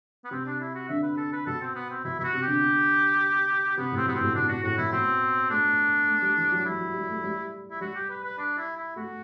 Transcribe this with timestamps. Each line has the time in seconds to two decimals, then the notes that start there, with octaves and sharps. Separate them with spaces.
0.24 B3
0.31 C3 C4
0.45 D4
0.60 E4
0.74 F#4
0.89 D3 E5
1.03 B4
1.17 A4
1.32 B4
1.46 B2 A4
1.61 C4
1.75 B3
1.90 C4
2.04 B2 E4
2.19 B2 E4
2.24 F#4
2.33 C3
2.42 G4
2.47 D3
3.77 C3 B3
3.92 A2 C4
4.06 B2 B3
4.15 C4
4.21 A2
4.35 B2 D4
4.49 B2 F#4
4.63 A2 F#4
4.78 B2 E4
4.92 B2 C4
5.50 A3 D4
6.08 A3
6.22 G3
6.37 E3
6.51 F#3
6.65 G3 E4
6.80 F#3
6.94 G3
7.09 A3
7.23 G3
7.71 E4
7.81 G3 F#4
7.95 G4
8.09 B4
8.24 B4
8.38 D4
8.58 E4
8.77 E4
8.96 A3 F#4